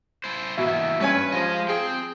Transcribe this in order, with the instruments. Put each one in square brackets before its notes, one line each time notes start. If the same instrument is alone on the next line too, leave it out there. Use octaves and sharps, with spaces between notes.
[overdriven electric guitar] E4 C5
[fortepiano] B2 [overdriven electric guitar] E3 A#3 [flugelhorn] E5
[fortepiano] G2 C#4 G#5 [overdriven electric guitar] B4
[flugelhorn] F3 [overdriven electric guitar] G#3 D#5
[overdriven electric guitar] C4 G5 [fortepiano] G#4